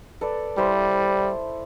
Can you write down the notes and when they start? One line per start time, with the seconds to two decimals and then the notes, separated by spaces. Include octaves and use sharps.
0.21 A4 B4 D5
0.58 G3 E4 C5 C6